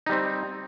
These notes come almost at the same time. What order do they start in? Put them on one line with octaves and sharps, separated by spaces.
D#4 G3 C4